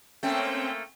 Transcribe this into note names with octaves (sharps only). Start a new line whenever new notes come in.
A3 A#3 C4 C#4 G5